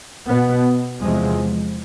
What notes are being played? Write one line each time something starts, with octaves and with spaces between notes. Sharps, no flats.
B2 B3
E2 C3 F3 G#3